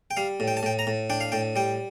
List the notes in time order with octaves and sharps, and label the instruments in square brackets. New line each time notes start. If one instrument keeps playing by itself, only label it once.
[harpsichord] G5
G3 F5
A2
G5
A5
A2 G5
A#5
A2
D4 G5
F5
A2 G5
G3 G5